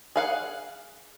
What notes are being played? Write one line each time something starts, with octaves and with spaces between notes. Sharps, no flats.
G#4 F5 F#5